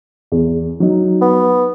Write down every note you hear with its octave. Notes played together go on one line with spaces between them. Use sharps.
E2
F#3 D#4
B3